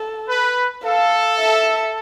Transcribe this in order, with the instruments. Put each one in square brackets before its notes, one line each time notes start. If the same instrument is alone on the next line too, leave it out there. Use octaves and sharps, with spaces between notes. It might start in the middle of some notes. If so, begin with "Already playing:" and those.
Already playing: [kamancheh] A4
[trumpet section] B4
[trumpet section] A4 [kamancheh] F5
[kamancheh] E5